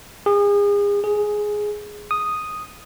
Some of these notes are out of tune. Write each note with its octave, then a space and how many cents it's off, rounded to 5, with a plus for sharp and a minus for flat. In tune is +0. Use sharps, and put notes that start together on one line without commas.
G#4 -35
G#4 +5
D#6 +0